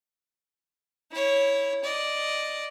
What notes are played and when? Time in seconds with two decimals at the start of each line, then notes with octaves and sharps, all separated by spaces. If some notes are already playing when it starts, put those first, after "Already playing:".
1.11 E4 C#5
1.84 D5 D#5